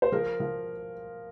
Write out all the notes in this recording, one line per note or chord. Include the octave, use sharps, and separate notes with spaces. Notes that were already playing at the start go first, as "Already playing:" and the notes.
C5
F3 A#4
F3